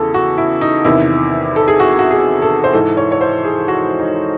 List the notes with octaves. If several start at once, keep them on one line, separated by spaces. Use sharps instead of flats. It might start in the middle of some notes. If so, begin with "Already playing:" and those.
Already playing: E2 C#3 E3 G#4 A4
F#4
E4
D#4
E2 C3 D#3 E4
A4
G#4
F#4
F#4
G#4
A4
C5
G#2 E3 A4
C#5
C#5
C5
G#4
F#4
D#4